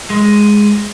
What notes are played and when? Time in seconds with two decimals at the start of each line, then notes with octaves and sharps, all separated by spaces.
0.10 G#3